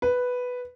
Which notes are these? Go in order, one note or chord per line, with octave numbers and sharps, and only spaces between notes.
B4